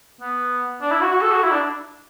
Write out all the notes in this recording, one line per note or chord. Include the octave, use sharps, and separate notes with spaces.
B3
D4
E4
F#4
F#4
A4
F#4
E4
D4